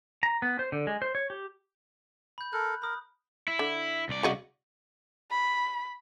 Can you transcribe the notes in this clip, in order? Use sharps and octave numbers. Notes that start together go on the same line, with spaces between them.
A#5
B3
C5
D3
G#3
C5
C#5
G4
B5 G6
A4 A#4 F#6
A#4 B5 D#6
E4
D3
C2 D5
C#3 F#4 D#5
B5